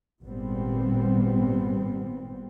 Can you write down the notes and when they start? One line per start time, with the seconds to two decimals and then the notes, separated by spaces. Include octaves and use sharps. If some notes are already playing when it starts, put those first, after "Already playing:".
0.24 G#1 A#2 G3 B3 C4